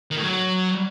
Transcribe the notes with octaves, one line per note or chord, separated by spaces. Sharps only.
D#3
A2
F#3